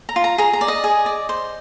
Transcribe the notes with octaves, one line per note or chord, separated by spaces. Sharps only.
A#5
F4
A#5
G#4 A#5
A#5
D5
D#5
G#4
D5
C5